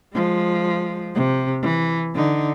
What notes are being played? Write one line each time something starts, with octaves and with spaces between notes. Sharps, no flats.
F3 G#3
C3
E3
D3 D#4